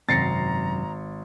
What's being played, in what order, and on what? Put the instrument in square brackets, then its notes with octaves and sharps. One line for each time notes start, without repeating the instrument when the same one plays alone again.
[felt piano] G#1 C7 C#7 [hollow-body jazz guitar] F#2 C3 [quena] A#5 [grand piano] A6 A#6